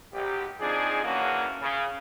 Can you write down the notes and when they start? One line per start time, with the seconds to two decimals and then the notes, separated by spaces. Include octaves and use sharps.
0.14 B1 G4
0.60 F3 C4 D4 D#4 G#4
1.04 C#3 E3 A#3 C#4 D4 F#4
1.62 C#3